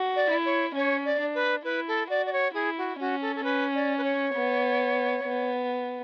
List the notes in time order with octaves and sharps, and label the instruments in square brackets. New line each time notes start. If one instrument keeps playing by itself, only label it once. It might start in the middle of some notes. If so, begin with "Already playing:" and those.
Already playing: [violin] F#4
[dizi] D5
[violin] E4
[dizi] C#5
[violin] C#4 [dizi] C#5
[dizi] D5
[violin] D4
[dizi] B4
[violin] E4 [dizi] B4
[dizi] A4
[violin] F#4 [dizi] D5
[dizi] D5
C#5
[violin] E4 [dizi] G#4
[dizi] F#4
[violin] C#4 [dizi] F#4
[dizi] A4
A4
[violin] C#4 [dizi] B4
[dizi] D5
B4
C#5
[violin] B3
B3